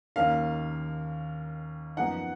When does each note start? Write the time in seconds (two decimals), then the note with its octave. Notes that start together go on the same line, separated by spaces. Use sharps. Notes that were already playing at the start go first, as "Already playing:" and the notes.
0.16 D#2 D#3 A#3 C#4 F5
1.97 F#2 F3 B3 D#4 F#5